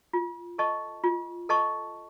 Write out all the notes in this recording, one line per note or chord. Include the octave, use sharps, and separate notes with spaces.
F4
A4 D#5 A5 C#6
F4
A4 D#5 A5 C#6